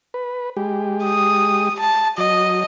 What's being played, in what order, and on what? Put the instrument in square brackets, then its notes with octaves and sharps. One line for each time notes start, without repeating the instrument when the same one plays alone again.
[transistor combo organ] B4
G#3 G4
[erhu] D#6
A5
[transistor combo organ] F#3 [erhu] D#5